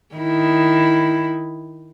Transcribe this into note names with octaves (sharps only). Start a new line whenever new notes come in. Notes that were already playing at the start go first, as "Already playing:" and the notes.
D#3 E4